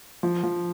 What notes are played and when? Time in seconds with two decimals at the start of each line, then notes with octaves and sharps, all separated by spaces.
0.23 F3
0.43 F3